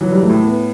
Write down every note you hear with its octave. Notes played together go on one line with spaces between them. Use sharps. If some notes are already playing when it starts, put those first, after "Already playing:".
E3 F#3
G3
A3
A2
B3